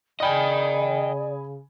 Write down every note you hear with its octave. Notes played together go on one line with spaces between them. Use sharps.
C#3 D5 D#5 G5 G#5 B5 D#6